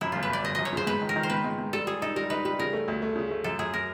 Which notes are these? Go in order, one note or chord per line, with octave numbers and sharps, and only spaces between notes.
F#2 E4
G1 F4
B4
G1 D5
G1 D#5
F#2 D#5
C#5
C#3 C5
G#2 B4
D#3
A#4
D#3
C5
G#2 B4
G#2
G#2
G3 A4
G3 G#4
D#4 A4
G3 A#4
D#4 B4
G3 B4
C#3 A#4
A3
D2
A3
C#3
A3
F#2 A4
F#2 G#4
A#4